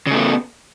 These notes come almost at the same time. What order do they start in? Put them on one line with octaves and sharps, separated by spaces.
C#3 A3 B3